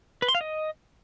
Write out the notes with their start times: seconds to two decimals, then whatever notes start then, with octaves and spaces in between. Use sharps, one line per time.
0.22 B4
0.28 C6
0.35 F5
0.41 D#5